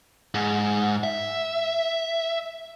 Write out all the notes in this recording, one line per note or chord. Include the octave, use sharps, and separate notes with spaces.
G#2
E5